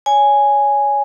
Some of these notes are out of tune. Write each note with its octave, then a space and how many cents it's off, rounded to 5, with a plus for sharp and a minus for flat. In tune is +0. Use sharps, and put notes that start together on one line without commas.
C#5 +25 G#5 +0